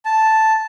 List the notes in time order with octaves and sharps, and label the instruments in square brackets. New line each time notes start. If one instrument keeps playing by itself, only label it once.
[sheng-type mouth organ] A5